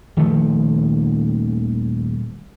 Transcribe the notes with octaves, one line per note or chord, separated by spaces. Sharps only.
D#1 D#3 F3 A3